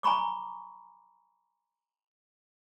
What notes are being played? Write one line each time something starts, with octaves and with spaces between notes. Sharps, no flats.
G#5 A#5 B5 C#6 D6